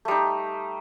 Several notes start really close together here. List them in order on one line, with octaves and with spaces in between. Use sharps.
A3 G3 D#4